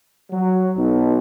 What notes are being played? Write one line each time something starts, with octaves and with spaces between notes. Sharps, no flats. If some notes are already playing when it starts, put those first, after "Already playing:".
F#3
B1